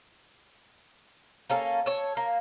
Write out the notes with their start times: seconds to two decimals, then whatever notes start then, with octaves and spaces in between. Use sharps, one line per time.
1.50 A#3 C#4 A4
1.86 A4 C#5
2.17 A#3